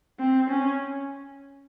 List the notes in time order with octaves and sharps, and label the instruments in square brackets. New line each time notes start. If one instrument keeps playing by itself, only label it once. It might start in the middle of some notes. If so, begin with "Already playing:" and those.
[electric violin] C4
C#4